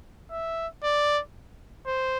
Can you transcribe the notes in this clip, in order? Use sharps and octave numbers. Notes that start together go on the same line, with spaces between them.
E5
D5
C5